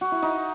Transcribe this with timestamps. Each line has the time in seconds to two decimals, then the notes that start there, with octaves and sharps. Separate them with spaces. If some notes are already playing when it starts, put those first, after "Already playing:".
0.01 F#4
0.12 E4
0.22 D#4